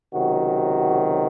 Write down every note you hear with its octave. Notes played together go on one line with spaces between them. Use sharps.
C#2 C3 D#3 F#3 F#4